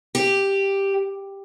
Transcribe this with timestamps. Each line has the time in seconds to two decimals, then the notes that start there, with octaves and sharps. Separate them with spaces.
0.15 G4